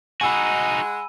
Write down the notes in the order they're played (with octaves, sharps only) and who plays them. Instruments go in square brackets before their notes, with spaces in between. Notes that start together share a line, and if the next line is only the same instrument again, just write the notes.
[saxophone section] G#3 F#5 [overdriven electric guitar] D#4 F#4 [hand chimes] G#5 [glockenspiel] B5 E6 D#7